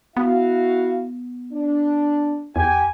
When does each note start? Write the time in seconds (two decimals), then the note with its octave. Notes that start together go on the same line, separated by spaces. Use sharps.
0.17 B3 E4 F#4 F5
1.53 D4
2.56 E2 G4 G5 G#5